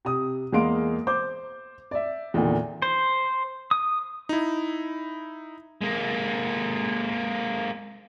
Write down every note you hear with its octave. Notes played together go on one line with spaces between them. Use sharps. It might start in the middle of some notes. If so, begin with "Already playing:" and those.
C3 D#6
E2 G#3 A#3 F5 C6 D7
C5 D6 G6
D5 E5
E2 A#2 D3 D#3
C5
D#6
D#4 E4
G#3 A#3